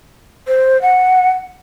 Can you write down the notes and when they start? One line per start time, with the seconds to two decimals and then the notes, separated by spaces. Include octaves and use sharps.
0.48 C5
0.82 F#5